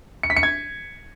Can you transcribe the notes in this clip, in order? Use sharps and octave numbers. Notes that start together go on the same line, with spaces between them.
C#7
B6
C#7
G#6